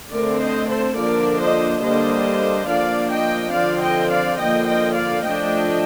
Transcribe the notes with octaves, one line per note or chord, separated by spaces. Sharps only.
D3 A3 C4 A#4 D5
C5 D#5
A4 C5
D3 F3 A#3 D4 A#4 D5
C5 D#5
D3 G3 A#3 D4 C5 D#5
F3 A#3 D4 D5 F5
D#5 G5
D3 F3 C4 D5 F5
D#5 G5
D5 F5
D3 F3 A#3 D#5 G5
D#5 G5
D5 F5
F3 A3 D4 D#5 G5